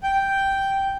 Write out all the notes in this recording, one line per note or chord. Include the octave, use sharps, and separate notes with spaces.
G5